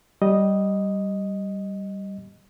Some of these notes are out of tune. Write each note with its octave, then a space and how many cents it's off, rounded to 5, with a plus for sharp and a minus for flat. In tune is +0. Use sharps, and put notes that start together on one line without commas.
G3 -10 D#5 +0